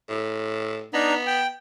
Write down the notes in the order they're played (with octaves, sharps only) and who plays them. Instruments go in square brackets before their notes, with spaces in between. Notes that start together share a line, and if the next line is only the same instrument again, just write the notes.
[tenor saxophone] A2
[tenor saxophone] B3 [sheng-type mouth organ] D4 D#4 A#5
[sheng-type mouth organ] G5